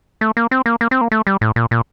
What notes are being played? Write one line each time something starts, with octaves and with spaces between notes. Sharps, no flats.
A3
A#3
C4
A#3
A#3
C4
A#3
A3
G3
A2
A#2
A#2